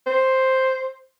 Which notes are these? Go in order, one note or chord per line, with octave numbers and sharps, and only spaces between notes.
C5